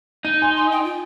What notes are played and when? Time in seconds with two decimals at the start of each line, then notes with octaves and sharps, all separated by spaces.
0.25 D#4 D#7
0.42 G#5 C6
0.56 C6
0.72 G5
0.84 F4